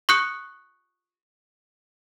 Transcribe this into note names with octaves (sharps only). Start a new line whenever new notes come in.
C#6 D#6 F#6 G6 C#7